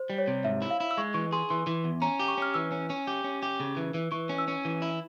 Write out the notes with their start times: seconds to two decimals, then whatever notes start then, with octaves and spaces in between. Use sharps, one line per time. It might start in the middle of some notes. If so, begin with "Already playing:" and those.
Already playing: C5
0.10 G3
0.18 C#5
0.28 C3
0.44 G#2 E5
0.62 E4
0.71 F5
0.80 E4
0.91 E6
0.97 G#3 C#6
1.14 E3 C#6
1.32 G#4 C6
1.50 E3 C6
1.67 E3
1.84 E2
2.02 C#4 A#5
2.19 G4
2.28 C#6
2.38 C#4 F6
2.54 E3 E6
2.72 C#4
2.90 C#4
3.07 G4
3.24 C#4
3.43 G4
3.60 C#3
3.77 E3
3.94 E3
4.12 E3 C#6
4.29 C#4
4.38 E6
4.48 C#4
4.65 E3
4.82 E4